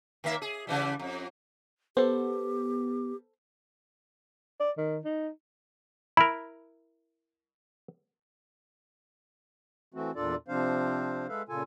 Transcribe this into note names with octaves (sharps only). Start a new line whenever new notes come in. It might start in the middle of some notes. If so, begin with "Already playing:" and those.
D#3 A#3 E5
G#4
C#3 E3 G3
F2
B3 G4 A4 C5
D5
D#3
D#4
E4 A#4 B5
E3 A3 C4 F#4
E2 A#2 D4 F4 A4 D5
C3 F3 C4 D4 C5 F5
G#3 A4 B4 E5 F5
A#2 C#3 F4 A4 G#5